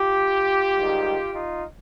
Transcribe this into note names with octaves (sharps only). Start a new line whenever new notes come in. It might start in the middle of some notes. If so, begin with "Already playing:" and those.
Already playing: F4 G4
G#2 D#3 G3
D#4 F4